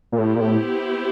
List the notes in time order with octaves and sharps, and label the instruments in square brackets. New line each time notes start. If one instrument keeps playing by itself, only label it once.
[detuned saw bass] A#2
[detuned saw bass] A2 [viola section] B3 E4 G4 C5
[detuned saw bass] A#2
A2